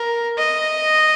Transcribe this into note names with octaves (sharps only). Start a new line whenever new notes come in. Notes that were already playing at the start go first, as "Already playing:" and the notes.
Already playing: A#4
D#5